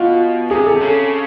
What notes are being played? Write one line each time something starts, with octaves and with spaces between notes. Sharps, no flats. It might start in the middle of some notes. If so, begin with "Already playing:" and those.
Already playing: B2 F4
C3 G#4
A4
C#3